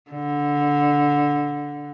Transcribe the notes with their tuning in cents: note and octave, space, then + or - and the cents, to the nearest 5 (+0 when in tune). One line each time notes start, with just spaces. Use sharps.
D3 -10